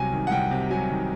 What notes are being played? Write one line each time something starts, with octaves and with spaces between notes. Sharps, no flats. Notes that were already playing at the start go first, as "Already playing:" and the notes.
Already playing: C2 C3 F#3 G#5
D#3
F#5
C2 G5
C3
F#3 G#5
D#3